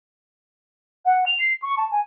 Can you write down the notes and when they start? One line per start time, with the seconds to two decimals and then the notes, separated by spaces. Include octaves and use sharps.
1.05 F#5
1.26 F7
1.40 C7
1.62 C#6
1.78 A5
1.91 G#5